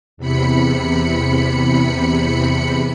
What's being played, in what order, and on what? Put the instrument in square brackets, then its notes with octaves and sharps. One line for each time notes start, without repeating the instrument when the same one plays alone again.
[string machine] E2 C3 B5 C#7